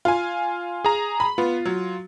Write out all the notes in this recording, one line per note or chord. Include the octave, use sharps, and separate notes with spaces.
F4 G#5
G#4 A#5
B5
B3 F4
F#3